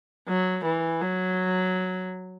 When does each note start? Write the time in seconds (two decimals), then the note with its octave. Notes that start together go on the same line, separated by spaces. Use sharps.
0.28 F#3
0.65 E3
1.02 F#3